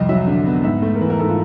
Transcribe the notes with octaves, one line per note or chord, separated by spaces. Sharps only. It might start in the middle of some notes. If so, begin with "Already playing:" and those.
Already playing: C2 F2 D#5
F#3 E5
D3
B3
G#2 E5
A3
A#4
E3 B4
A#4
G#2 A4
F4